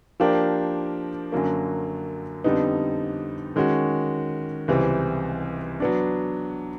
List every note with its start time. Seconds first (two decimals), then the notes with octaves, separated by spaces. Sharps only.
0.20 F3 A#3 D4 G4 A#4
1.32 F#2 D3 F#3 A#3
2.44 F2 D3 G3 B3 D#4
3.56 D#3 G#3 C#4 F#4
4.68 C#2 C3 E3 G3 C4
5.80 F#3 B3 D4